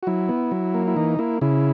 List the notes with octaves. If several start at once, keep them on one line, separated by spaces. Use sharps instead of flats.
F#4
F#3 E4
B3
F#3
A#3
E4
E3 D#4
A#3 E4
C#3 E4